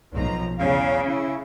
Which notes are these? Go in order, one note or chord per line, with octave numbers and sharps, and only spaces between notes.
B1 F3 A#5
E2 C#3 F5
E4